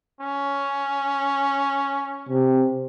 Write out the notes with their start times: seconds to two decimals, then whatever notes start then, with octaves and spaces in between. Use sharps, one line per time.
0.21 C#4
2.29 C3